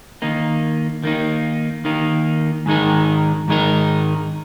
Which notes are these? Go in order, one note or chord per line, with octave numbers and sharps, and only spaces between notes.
D#3 A#3 D#4
D#3 A#3 D#4
D#3 A#3 D#4
G#2 D#3 G#3 D#4 A#4
G#2 D#3 G#3 D#4 A#4